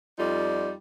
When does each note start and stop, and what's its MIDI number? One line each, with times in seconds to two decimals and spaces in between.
0.18 0.73 41
0.18 0.73 55
0.18 0.73 63
0.18 0.73 65
0.18 0.73 74